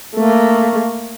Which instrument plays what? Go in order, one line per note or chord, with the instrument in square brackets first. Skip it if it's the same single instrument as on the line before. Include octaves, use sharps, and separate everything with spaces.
[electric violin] A3 A#3